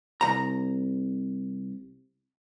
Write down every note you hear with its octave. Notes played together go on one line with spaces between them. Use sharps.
C2 A#5